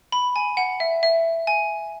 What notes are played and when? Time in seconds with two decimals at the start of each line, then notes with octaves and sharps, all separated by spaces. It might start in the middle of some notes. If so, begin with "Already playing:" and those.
0.12 B5
0.36 G#5
0.57 F#5
0.80 E5
1.03 E5
1.47 G#5